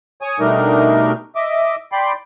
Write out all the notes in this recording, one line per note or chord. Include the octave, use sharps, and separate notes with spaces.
C#5 G#5 D#6
B2 G3 A3 D4 D#4 A#4
D#5 E5 D6
D5 G5 B5 C6